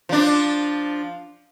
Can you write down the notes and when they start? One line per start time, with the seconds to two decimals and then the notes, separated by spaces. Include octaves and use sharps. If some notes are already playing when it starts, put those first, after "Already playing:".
0.09 F3 D4